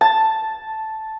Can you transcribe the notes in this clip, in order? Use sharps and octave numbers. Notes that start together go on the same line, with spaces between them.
A5